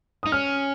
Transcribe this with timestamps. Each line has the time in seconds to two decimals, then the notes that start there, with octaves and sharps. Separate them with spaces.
0.23 D#4 D#6
0.32 C#4 F6